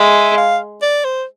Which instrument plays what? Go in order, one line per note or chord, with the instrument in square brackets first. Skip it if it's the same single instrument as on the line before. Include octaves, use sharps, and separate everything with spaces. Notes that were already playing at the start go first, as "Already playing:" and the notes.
Already playing: [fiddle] G#3 [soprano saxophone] E5
[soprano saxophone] F5
D5
C5